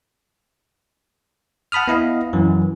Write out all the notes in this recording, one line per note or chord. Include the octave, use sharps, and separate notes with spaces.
F#5 A5 B5 D#6 F6
B3 E4 D#5 F5
F#2 E3